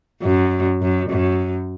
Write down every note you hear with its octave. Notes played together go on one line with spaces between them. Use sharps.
F#2
F#2
F#2